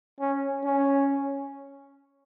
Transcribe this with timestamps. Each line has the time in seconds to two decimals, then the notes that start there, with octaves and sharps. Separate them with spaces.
0.21 C#4
0.65 C#4